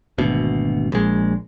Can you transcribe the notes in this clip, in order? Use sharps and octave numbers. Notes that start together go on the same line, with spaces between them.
G#1 D2 B2
A#1 G#3